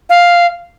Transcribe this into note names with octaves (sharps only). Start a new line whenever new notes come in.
F5